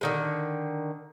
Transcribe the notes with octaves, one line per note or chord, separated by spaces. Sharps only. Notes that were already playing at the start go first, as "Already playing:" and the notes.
D3 D#3 G#3